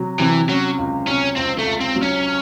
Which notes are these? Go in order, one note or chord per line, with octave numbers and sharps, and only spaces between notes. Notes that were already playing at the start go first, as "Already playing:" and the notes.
Already playing: C3 F#3
C3 E3
F#3 C#4
C#2
C3 C#4
C#2 C4
A3
C#2
C4
F#3
C#4